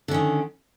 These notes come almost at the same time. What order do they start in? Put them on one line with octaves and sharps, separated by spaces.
D3 C#4 D#3